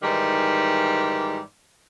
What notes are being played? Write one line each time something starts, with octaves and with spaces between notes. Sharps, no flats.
G#2 D#3 E3 G3